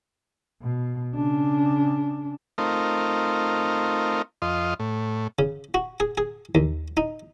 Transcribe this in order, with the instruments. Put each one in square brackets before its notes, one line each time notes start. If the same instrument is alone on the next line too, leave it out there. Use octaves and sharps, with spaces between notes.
[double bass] B2
C#3 D4
[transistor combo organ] A3 C4 D#4 F4 A#4
F2 F4 D#5 C6
A2
[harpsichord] C#3
F#4
G#4
G#4
D#2
D#4